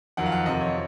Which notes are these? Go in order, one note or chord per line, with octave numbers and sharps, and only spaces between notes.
F2 D#3 F#3 F#5
F5
F#5
F2 C3 F3 D#5
C#5